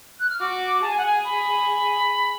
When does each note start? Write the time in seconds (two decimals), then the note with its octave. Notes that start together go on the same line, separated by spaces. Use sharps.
0.20 F#6
0.29 F6
0.40 F#4 D6
0.82 G#4 A5
0.90 G#5
0.98 F#5
1.06 G#5
1.24 B5